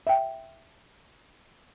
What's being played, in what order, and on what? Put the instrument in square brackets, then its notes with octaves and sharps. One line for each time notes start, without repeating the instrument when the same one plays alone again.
[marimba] E5 G5